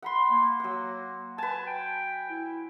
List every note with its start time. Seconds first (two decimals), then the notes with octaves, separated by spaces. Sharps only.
0.02 F#5 B5 C6
0.31 A#3
0.60 F#3 F#5
1.38 B4 G#5 A5
1.67 G5
2.30 E4